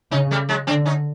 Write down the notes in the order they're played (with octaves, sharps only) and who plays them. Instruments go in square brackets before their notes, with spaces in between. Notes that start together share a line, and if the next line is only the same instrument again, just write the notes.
[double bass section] C#3 [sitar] C#4 D#4
[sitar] G3 A3
F#3 G#3
[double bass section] D3 [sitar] C4 D4
[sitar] C#4 D#4